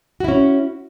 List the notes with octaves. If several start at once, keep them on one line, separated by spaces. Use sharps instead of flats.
C#4 E4 F#4